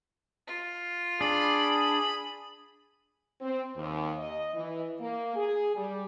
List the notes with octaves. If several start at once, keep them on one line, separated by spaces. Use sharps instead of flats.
F4
D4 G#4 B5
C4
D#2
D#5
E3
A#3
G#4
G3